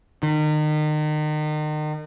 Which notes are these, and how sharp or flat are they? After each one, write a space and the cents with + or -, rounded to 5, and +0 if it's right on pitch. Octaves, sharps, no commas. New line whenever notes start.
D#3 -35